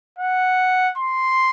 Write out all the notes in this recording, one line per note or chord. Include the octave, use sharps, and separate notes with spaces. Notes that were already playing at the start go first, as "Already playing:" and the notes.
F#5
C6